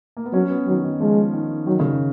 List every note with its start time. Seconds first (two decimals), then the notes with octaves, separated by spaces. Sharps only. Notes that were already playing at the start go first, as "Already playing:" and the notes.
0.17 A#3
0.26 B3
0.33 F#3 C#4
0.50 B3
0.67 D#3 F#3
0.84 D#3
1.00 F3 G#3
1.33 D#3
1.67 D#3 F#3
1.79 C#3